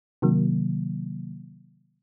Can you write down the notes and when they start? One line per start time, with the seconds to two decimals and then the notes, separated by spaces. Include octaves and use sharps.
0.22 C3 D#3 F#3 A#3